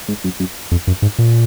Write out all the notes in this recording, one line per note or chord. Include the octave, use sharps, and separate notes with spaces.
G#2
F#2
F#2
F2
F#2
G#2
A#2